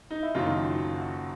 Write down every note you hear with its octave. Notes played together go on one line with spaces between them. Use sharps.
D#4
E4
F#1 F#2 D#3 F#3 F4
F#4